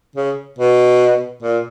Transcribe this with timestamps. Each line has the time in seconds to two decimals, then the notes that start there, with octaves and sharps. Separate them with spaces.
0.16 C#3
0.58 B2
1.43 A#2